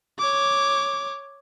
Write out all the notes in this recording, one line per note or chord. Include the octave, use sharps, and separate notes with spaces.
C#5 D6